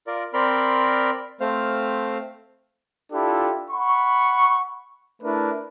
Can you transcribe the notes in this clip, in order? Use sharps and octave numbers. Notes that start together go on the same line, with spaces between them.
F4 A#4 D5
C4 A#4 D5 B5 C6 F6
A3 C4 C5 F5 F6
D4 E4 F4 G4 A4
F#5 B5 C#6
A3 D4 E4 A#4 B4